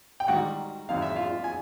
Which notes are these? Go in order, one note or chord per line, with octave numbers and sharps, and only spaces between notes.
G5
G#2 D#3 G3 F#4 F#5
G#1 F#2 D#3 F5
E5
F4 F5
G#5